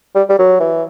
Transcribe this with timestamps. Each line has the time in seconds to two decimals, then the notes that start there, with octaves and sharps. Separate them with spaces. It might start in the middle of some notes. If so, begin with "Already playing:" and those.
0.15 G3
0.29 G3
0.38 F#3
0.60 E3